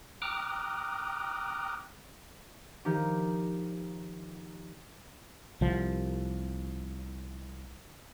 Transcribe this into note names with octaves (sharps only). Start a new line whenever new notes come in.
G5 A#5 D6 D#6 F6 F#6
D#3 F3 D#4 G4
C2 F3